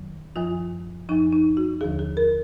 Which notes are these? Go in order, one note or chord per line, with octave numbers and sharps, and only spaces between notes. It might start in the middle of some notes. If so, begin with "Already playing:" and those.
Already playing: F2 D#3 F#3
F#2 F3 F4
F#2 F3 D#4
D#4
F#4
D#2 D3 F3 G#4
G#4
A#4